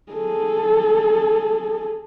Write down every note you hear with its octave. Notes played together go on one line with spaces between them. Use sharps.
G#4 A4